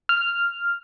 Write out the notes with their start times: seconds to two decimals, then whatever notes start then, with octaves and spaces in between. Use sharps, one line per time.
0.09 F6